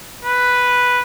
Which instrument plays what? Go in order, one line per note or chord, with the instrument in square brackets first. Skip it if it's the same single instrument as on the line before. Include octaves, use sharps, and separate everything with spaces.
[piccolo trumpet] B4